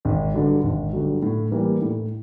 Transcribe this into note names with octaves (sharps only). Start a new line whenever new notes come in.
G#1
G2 D3 F#3
G#1
G2 D3 F#3
A2
E3 G3 A#3
A2